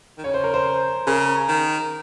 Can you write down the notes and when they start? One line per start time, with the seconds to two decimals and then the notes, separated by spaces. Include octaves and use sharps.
0.18 D#3
0.24 C#3 C#5
0.34 C5
0.44 A#4
0.54 C5
1.07 C#3 A#4
1.48 D#3